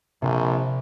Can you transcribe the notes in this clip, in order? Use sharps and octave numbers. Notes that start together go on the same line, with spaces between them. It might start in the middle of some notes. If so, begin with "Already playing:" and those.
A#1 C3